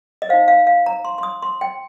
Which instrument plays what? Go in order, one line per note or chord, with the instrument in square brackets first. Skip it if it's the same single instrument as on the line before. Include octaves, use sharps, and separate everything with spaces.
[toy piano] D#5
D#4 C5 F5
F5
F5
A#5
C6
C6
D#6
C6
G5